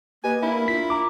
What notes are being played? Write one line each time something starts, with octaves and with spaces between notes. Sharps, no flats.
A#3 G4 B4 D#5 G#5
D4 E4 A#4 B5
F4 B6
A#5 D6